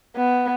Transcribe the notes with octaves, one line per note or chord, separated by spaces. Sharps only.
B3